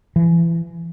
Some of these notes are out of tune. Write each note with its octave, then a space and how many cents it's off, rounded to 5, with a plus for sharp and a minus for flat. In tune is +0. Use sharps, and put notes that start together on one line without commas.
E3 +30